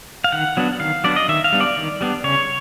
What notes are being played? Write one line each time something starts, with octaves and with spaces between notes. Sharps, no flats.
F5
D#3 F#5
F#3 B3 D4
D#3 F5
F#3 B3 D4 D5
D#5
D#3 E5
F5
G3 B3 D4
D5
D#3
G3 B3 D4
C#3 C#5